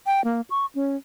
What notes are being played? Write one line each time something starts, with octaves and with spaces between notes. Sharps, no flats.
G5
A#3
C#6
C#4